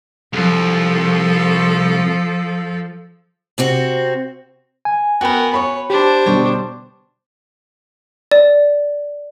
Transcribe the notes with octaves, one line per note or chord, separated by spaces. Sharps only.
C2 F3 A4
C3 C4 F#4
G#5
B3 F#4 A#4 B4 G5
C#5 B5 C#6
D4 G4 C5
B2 D3 G3 C#5
D5